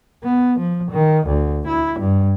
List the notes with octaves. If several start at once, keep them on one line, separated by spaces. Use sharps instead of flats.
B3
F3
D#3
D2
E4
G2